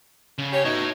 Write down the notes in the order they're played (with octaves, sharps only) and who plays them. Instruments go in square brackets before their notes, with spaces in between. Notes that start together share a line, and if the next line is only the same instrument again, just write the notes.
[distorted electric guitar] C#3
[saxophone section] G4 C#5
[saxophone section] B2 D#4 [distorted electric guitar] E4 C#5